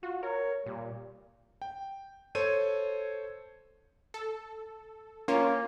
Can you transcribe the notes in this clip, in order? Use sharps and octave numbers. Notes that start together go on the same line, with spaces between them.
F4 F#4
A#4 C#5
A#2 G3
G5
A4 C5 C#5 G#6 D#7
A4
A#3 C#4 F4 C#5